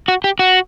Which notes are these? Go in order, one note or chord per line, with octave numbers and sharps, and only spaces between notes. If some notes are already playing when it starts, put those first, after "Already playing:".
F#4
G4
F#4